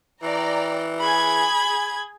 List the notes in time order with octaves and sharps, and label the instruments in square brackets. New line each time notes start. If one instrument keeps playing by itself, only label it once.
[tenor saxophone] E3 [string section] D5 G5 A#5
[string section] G#4 G#6 [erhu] B5